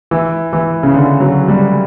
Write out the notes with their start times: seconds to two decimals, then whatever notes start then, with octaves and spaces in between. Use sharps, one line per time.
0.11 E3
0.53 E3
0.83 C#3
0.94 D3
1.20 F#3
1.48 G3